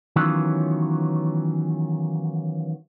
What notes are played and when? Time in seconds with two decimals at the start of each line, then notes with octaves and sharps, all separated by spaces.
0.16 D#3 E3 F#3 B3 C#4 F4